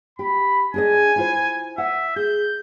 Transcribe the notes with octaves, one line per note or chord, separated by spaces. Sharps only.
G4 B5
D4 G#4 D#5 G#5
E4 F4 C5
E5 F#5
G#4 G6